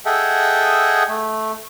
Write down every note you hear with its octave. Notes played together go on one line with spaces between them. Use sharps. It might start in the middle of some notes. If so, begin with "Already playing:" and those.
G#4 A4 D#5 E5 F#5 G5
A3